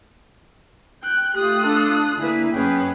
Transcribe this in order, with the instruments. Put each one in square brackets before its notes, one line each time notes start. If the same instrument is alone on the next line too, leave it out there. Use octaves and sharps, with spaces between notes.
[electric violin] G5 F#6
[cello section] A3 F4 [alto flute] G4 [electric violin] D#6 F#6
[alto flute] D4 [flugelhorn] A4
[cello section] D3 A#3 B4 [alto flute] E4 [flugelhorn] G#4
[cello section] F#2 B3 [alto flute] C#4 [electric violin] G#4 B4 [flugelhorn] G5